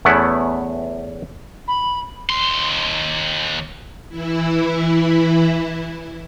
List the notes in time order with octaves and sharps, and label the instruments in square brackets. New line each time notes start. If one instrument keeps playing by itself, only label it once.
[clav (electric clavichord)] E2 A3 B3 C#4 E4 F#5
[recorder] B5
[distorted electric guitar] D#2 C6
[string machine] E3 E4